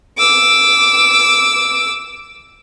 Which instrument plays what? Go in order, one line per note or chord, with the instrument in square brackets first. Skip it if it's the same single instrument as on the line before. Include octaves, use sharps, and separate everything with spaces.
[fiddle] D6 E6